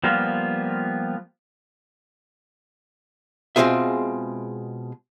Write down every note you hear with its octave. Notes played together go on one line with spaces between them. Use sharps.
F3 G3 A#3 B3 F4
B2 G#3 C4 F4 G#4 E5